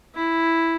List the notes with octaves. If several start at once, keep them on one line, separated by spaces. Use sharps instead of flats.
E4